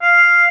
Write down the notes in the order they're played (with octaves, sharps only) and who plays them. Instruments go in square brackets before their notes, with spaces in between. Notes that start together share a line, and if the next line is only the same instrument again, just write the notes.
[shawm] F5